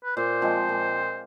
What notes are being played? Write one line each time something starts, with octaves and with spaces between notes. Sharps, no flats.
B4
A#2 C5
F3 G#3 C4
A#2